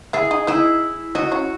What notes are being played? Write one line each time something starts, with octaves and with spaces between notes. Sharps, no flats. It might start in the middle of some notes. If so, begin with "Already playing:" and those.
E4 G#4 E5
D#4 D#5
D#4 E4 D#5
D#4 F#4 D#5
C#4 C#5